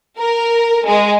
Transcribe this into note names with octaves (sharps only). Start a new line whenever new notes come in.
A#4
G#3